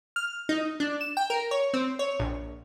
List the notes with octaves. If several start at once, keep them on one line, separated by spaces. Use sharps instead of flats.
F6
D#4
D4
E7
G5
A#4
C#5
C4
C#5
A#1